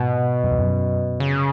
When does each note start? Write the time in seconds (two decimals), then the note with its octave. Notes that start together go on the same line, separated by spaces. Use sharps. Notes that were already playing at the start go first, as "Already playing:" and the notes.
Already playing: G#2 B2
0.43 F#2
0.51 E2
0.58 F#2
1.20 C#3